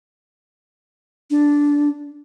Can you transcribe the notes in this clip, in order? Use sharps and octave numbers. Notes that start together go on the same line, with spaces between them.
D4